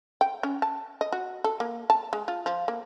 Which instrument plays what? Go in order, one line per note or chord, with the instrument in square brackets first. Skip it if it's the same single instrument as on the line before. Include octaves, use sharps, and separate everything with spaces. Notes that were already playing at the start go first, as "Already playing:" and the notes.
[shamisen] G5
C#4
A5
D#5
F#4
A4
A#3
A5
G#3
F4
F3
A#3